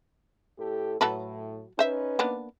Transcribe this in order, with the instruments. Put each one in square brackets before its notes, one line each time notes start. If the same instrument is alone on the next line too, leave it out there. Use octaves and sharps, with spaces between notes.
[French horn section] A2 G4 A4
[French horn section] A2 [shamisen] F#3 A4 B4
[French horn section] C#4 D#4 B4 [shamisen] C5 E5
[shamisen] A#3 B3 D4